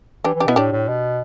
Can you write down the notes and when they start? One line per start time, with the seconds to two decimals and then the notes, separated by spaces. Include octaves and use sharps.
0.24 E3 D4 G4
0.35 E3
0.40 D4 G4
0.46 B2 B3 E4
0.56 A2 D4 G4
0.73 A2
0.88 B2